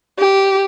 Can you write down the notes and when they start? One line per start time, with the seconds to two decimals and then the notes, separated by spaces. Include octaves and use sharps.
0.19 G4